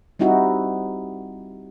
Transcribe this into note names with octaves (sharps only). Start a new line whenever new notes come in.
G3 C4 D#4 E4 F#4